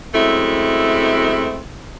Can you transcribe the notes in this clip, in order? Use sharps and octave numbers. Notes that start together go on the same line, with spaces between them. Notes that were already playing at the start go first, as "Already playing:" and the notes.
F#2 G#3 A3 C4 E4